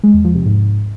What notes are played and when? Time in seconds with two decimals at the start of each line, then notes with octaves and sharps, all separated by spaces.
0.03 G#3
0.14 E2
0.24 F3
0.35 C3
0.45 G#2